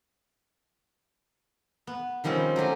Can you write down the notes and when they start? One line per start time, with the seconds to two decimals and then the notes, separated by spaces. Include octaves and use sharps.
1.87 B3
2.24 D#3 F3 G3 C4 C#4
2.56 F#3 A3 G4 G#5